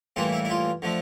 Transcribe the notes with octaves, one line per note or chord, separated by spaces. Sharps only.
A2 E3 G3 A#3 F4
E4
E4
F4
D3 F3 A3